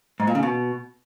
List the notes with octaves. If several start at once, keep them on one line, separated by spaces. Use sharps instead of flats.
G#2
A#2
C#3
B2